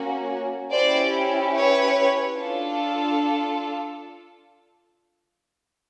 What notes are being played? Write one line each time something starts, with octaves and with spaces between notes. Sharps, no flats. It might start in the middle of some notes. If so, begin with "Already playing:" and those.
Already playing: A#3 C#4 F#4
C#4 E4 G4 C5 D5
B4 C#5
D4 F4 A4